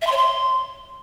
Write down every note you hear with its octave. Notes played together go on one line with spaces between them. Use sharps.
E5
C6
C#5
C6